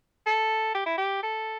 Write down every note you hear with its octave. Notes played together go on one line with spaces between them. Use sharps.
A4
G4
E4
G4
A4